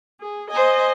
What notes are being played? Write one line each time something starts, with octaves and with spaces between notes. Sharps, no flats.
G#4
C5 D#5 G#5